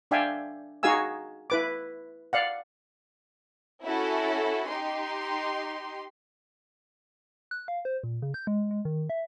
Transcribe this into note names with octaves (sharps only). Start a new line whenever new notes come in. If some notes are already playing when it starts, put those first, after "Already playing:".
D4 D5 E5 F5 G5 G#5
D#4 F#4 G#4 F5 G#5 E6
E4 B4 D6
D5 F5 F#5
C#4 E4 F#4 A4
D#4 G4 C6
F#6
F5
C5
A#2
C#3
G6
G#3
G#3
D#3
E5